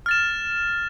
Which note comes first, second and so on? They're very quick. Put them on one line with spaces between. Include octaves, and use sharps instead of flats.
F6 A6 E7